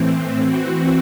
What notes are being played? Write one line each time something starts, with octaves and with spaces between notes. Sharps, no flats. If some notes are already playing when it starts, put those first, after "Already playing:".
Already playing: A2 E3 C4
E3 C4 F#4